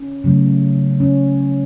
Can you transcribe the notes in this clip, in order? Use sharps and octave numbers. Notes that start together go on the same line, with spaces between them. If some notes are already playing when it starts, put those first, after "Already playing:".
Already playing: C#4
C#3 F#3 A3
C#4